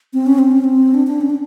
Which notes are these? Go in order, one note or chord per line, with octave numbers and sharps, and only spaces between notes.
C4
C#4
C4
C#4
C4
D4
D4
C#4
D4